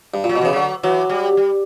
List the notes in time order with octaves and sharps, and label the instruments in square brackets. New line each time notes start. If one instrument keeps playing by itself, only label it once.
[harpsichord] G2
A#2
[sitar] F#3
[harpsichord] B2
[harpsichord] C#3 [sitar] E3
[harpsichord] D3 [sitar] F#3
[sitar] E3 [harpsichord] F#3
[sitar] G3
G3